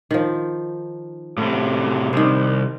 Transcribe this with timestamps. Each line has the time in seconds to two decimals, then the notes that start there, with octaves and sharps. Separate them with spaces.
0.11 D#3 F3
1.38 A2 C3
2.13 C2 D#3 C5